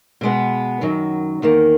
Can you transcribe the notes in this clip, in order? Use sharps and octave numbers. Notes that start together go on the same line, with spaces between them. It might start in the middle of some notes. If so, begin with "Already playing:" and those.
B2 G#3 B3
F#2 D#3 F#3
E2 D#3 A#3